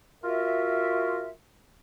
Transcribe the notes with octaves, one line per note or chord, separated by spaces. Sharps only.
F4 F#4 A#4 E5